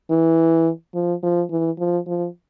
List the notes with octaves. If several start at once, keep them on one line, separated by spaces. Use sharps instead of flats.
E3
F3
F3
E3
F3
F3